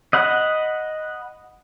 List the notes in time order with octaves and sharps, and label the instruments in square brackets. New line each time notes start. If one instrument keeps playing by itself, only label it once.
[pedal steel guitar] D#5 F#5 B5